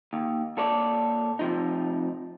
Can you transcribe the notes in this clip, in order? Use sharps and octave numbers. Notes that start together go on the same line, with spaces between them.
D#2
A#2 A4 C#5 D5
C3 F3 D#4